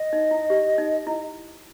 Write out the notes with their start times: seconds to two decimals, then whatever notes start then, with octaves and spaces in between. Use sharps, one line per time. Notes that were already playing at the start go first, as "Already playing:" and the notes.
Already playing: D#5
0.13 D#4
0.31 E4
0.50 G4
0.78 D#4
1.07 E4